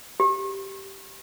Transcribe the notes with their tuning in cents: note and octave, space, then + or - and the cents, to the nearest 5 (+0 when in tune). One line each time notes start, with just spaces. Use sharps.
G4 -10